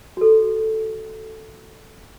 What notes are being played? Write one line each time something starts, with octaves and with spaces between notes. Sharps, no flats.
F#4 A4